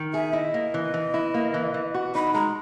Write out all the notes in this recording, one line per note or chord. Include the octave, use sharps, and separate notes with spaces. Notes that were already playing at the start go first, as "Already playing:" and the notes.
Already playing: D#3
G#4 E5
E4 D#5
A#3
E3
E3
E4
A#3
E3
E3
F#4
D#4 B5
G#3 A#5